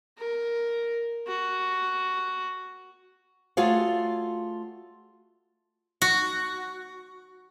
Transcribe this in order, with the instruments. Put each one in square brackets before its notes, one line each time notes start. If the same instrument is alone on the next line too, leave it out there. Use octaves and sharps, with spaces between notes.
[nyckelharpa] A#4
F#4
[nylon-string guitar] A3 F4 F#4 G#4 C#5 F5
[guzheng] F#4